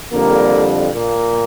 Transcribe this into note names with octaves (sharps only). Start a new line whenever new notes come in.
F2 D3 G3 A#3 A#4
A#2 A#3